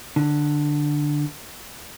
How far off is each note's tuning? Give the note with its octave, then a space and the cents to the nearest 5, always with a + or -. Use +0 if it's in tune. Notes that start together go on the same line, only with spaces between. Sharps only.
D3 +10